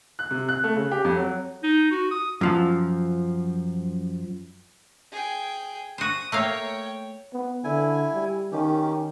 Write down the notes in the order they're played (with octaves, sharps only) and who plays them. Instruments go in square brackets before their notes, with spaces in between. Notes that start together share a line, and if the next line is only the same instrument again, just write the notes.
[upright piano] F#6
C3
F#6
A3
C#3
G4
F2
F#3
[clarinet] D#4
F#4
D#6
[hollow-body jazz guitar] F#2 F3 A5
[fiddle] G#4 G5
[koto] F#4 C5 [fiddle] D#6
[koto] A3 A#3 F5 [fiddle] C#5 G5
[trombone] B3
[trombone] D3 [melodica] E4 G#5
[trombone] G3
[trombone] D#3 [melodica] C#4 G4